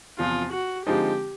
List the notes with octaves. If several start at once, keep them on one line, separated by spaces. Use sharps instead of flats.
E2 C3 F3 F4
F#4
D3 F3 G#3 C4 D#4 G4